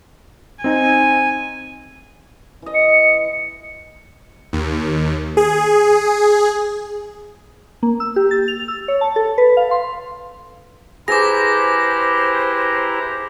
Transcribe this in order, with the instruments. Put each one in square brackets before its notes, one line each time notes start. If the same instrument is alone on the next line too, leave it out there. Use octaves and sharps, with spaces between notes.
[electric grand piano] C4 D#4 [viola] G#5
[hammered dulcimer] E3 D#5
[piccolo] C#7
[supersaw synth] D#2
G#4
[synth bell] A#3
E6
G4
A6
F7
E6
C#5
A5
A4
B4
F5
C6
[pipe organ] E4 G4 A#5 [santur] G#4 [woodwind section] B4 C5 [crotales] D6 A#6